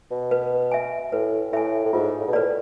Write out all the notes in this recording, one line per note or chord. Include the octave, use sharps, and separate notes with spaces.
B2
B4
E5 G#5
A2 B4
A2 E5 G#5
A2
G#2 F4
A2
B2
A2 B4 D5